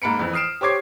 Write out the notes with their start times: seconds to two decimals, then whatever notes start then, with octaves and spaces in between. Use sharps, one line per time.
0.02 G#2 A#3 B5 C#7 D7
0.19 F2 E3
0.33 D#6 F6 C7 D7 E7
0.61 G4 C5 C#5 D6 G#6 C7